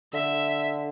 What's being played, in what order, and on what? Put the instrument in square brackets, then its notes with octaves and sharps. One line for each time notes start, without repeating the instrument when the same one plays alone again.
[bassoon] D3 [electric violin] E5